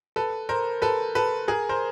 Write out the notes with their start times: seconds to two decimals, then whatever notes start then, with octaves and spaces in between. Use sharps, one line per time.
0.16 A4 B4
0.49 A#4 C5
0.82 A4 B4
1.15 A4 B4
1.48 G#4 A#4
1.69 A#4 C5